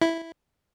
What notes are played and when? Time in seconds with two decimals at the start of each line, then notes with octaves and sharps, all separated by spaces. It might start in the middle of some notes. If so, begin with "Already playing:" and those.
0.02 E4